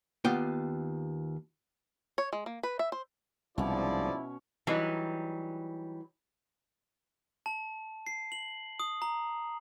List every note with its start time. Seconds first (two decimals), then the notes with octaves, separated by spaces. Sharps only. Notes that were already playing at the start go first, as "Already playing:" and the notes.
0.24 D#2 B3 F4 D5 G5
2.18 C#5
2.33 G#3
2.46 A#3
2.63 B4
2.79 E5
2.92 C5
3.58 C2 G#2 B2 F3 C#4 E4 C#5 D5
4.67 E3 F#3 G3 D#4
7.46 A5
8.07 C7
8.32 F#7
8.80 D#6
9.02 A#5